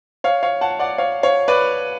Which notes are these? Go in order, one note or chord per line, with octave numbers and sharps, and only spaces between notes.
C#5 F5
C#5 F5
F#5 A5
D5 F#5
C#5 F5
C#5 F5
B4 D5